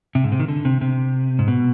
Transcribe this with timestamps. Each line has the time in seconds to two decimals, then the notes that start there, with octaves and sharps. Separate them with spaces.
0.15 C3
0.24 G#2
0.32 C3
0.40 D#3
0.48 D3
0.65 C3
0.81 C3
1.39 G#2
1.48 B2